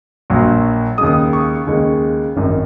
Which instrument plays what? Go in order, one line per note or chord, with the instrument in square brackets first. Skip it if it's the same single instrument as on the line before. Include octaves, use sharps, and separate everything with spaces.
[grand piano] A#1 A#2 F#3 A#3
D#2 C#3 G#3 D#6
C#6
D#2 C#3 G#3
G#1 F#2 D#3